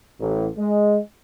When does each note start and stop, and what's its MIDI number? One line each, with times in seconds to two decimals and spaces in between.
0.20 0.47 33
0.57 0.98 56